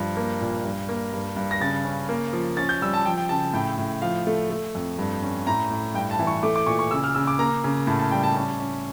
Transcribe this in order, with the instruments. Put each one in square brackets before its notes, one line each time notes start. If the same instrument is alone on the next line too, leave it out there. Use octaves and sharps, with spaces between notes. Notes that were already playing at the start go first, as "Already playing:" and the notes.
Already playing: [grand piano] G2 F3
A#3
A#2
G2
A#3
G2
G2
A#6
C#3 A6
C#4
A#3
F3
C#4 A6
G6
G3 E6
A5
F3 G5
G5
C#3 A5
A2 G5
A2
F3 F5
A3
A3
F2
G2
C#4
A2 A#5
A2
G2 G5
A5
E3
C#6
A3 D6
D6
A#2 C#6
C#6
C#3 E6
F6
C#3 E6
D6
A#3 A#5
C#3
A2 A5
A5
G3 G5
A5
C#4 A5
C#4